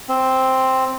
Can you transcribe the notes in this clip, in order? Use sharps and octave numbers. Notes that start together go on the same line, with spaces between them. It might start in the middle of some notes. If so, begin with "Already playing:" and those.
C4